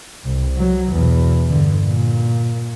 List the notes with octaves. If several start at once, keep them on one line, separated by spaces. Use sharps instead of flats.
C2
F#3
E2 B2
G2 D3
A#2